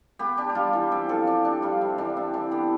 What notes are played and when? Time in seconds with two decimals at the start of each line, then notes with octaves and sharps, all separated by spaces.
0.19 B3 G4
0.37 D4 G4
0.50 G4
0.55 G3 F4
0.73 E3
0.92 C4
1.09 F3 A4
1.27 D4 G4
1.45 D4
1.62 G3 F4
1.81 C3
1.98 E3 D4
2.17 C4
2.34 E3 D4
2.51 B3 G4